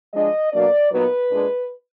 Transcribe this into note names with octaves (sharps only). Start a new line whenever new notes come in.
F3 G#3 D4 D#5
B2 F#3 A#3 D4 D5
A#2 F#3 B3 D#4 B4
A#2 G#3 D4